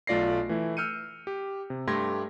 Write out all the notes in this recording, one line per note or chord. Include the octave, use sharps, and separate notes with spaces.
B1 A3 F4 D5 A#6 C7
E3 A3 E4
E6 F6 G6 C#7 D#7
G4
C3
G2 A3 G4 C6 G#6 A#6